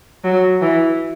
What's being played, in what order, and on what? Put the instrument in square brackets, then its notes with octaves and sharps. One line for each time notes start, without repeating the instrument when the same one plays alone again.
[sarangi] F#3
E3